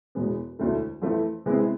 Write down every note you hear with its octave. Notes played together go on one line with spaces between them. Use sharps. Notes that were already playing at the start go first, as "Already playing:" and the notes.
E1 E2 B2 G#3 B3
E1 D2 D3 A3 E4
F2 E3 A3 E4
C3 G#3 B3 E4 G#4